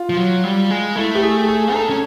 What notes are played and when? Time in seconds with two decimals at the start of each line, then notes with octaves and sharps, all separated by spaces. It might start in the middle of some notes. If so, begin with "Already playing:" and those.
Already playing: F4
0.10 F3
0.17 F#3
0.44 G3
0.71 G#3
0.96 A3 E4
1.15 G4
1.22 G#4
1.48 G#4
1.74 D#4 A4
1.82 D4
1.90 C#4